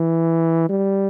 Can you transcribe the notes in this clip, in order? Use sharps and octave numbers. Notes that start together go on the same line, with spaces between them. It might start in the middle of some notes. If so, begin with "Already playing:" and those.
Already playing: E3
G3